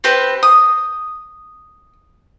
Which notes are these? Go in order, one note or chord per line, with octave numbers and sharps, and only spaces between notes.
C4 G4 B4
D#6